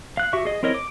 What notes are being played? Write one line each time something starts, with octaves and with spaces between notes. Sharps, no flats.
F5 F#6
F#4 G4 E5 C#6
G#4 D#5
C4 E4 A#4 C#5 D#5
D6